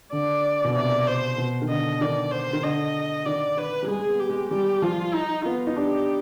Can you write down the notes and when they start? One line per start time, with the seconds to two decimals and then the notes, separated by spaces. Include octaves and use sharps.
0.12 D3 D5
0.64 B2
0.75 C3 D5
1.07 C5
1.38 B2
1.62 D#3
1.69 D3 D#5
2.01 D#3 D5
2.31 C5
2.53 D#3
2.63 D3 D#5
3.25 D#3 D5
3.57 D#3 B4
3.83 G3
3.88 G#3 G#4
3.99 G#3
4.09 B3
4.20 G4
4.30 G#3
4.51 G3 G4
4.82 F3 F4
5.14 D#4
5.44 B3 F4
5.67 D#4
5.76 D4 G4